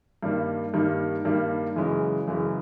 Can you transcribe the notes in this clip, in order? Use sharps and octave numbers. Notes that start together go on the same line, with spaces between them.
G2 D#3 G3 A#3
G2 D#3 G3 A#3
G2 D#3 G3 A#3
F#2 C#3 E3 G#3 C#4
F#2 C#3 E3 G#3 C#4